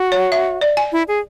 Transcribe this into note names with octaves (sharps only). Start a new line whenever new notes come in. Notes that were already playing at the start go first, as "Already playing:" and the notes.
Already playing: F#4
C#5
E5
D5
G#5
E4
G#4